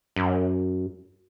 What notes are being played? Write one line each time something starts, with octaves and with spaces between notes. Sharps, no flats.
F#2